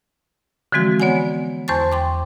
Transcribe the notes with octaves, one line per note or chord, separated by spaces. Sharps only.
D3 E3 F3 G#3 C4 F#4
B3 C#5 D5 F#5 G#5
E2 C5 A5 C6 C#6 A6
G5 C6 D6